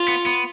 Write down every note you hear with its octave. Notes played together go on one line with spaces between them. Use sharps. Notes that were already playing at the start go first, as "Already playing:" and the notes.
Already playing: F4
B3
B3